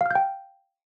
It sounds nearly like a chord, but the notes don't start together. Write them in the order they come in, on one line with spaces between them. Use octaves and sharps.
F5 F6 G6 G5